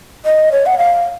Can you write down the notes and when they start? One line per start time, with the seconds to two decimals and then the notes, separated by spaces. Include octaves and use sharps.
0.25 D#5
0.52 C#5
0.66 F#5
0.78 F5